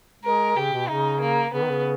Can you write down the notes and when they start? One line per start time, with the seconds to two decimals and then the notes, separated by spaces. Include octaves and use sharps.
0.23 G#3 A#4
0.57 C#3 G4
0.73 B2
0.89 C#3 D#4
1.21 A#3
1.54 C#3 B3
1.62 D#3
1.70 C#3